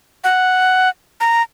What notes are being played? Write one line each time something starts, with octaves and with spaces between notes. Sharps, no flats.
F#5
A#5